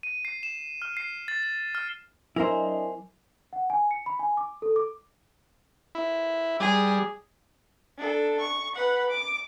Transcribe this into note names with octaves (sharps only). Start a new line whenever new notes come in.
D#7
C7
E7
F6
C7
A6
A6
F6
F#3 D4 E4 A#4 C5 D#5 G#5
F#5
G#5
C#7
B5
G#5
D6
A4
D6
E4
G3 G#4
D4 A4
C#6
B4 F#5
D6